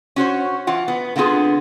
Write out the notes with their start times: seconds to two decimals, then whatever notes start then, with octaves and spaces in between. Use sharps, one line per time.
0.16 C#4 F#4 C5 C#5
0.67 E3 F4 F#5
0.88 B3
1.16 D3 B3 C4 F4 G#4